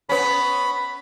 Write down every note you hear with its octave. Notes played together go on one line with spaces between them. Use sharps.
B3 C#4 B5